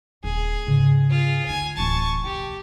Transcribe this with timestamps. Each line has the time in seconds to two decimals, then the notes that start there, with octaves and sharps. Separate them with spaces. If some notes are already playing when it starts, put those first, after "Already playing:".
0.24 D#1 G#4
0.67 G#2 C#3
1.10 F4 G#4
1.46 D2 D#4 G#5
1.77 D1 E3 A5 C#6
2.24 F1 B1 G4